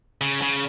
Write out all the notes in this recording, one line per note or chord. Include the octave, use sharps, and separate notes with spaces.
C#3
C#3